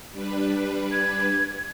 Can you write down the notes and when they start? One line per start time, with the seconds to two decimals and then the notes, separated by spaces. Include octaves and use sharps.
0.12 G3 D4 B4
0.92 G#6